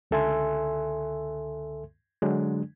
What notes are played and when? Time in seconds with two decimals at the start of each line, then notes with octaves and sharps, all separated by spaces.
0.11 C#2 D3 A4 E5 G#5 C6
2.22 D3 F#3 G#3 D4